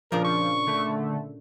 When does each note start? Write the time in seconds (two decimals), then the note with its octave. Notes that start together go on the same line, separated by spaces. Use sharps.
0.12 A#2 C#3 F3 D4 A#4
0.24 C#6
0.67 D3 A3